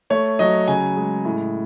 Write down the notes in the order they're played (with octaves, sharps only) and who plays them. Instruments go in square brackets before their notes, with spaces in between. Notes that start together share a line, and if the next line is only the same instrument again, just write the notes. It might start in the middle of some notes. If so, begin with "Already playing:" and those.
[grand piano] A3 C#5
F#3 D#5
C#3 G#5
G#3
A2